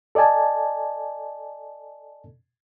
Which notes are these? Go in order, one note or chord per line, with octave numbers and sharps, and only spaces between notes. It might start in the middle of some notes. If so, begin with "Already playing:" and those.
A4 D5 D#5 G#5 A5